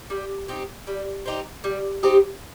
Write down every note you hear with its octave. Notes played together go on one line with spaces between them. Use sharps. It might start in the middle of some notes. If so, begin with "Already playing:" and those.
G3
C4 D#4 G4
G3
C4 D#4 G4
G3
C4 D#4 G4